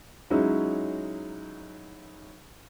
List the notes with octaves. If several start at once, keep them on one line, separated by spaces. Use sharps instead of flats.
F#3 G#3 C#4 D#4 E4